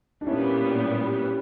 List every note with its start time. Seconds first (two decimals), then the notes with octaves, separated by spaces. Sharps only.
0.21 D4
0.26 A#2 G3 B3 C#4 E4